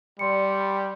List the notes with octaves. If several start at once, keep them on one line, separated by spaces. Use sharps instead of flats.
G3 D5 C6 C#7